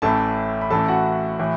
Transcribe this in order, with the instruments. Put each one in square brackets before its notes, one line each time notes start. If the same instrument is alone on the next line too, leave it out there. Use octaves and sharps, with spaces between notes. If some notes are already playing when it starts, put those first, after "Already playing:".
[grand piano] A1 A2 E3 A4 A5
B5
A1 A2 E3 A4 A5
F#4 F#5
A2 E3